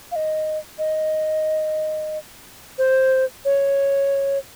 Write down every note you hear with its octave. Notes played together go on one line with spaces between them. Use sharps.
F5
D#5
D#5
C5
C#5